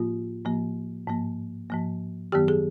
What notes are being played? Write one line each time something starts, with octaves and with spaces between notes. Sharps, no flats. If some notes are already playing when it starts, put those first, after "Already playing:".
Already playing: A2 F3 A#3 F4
A2 F3 A#3
G#2 F3 A#3
G#2 F3 A#3
F#2 D#3 F#3 B3 G4
G#4